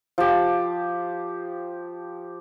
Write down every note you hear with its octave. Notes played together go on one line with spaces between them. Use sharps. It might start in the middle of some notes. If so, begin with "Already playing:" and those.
F3 G4